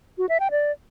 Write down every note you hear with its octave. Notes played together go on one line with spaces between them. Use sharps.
F#4
E5
G5
D5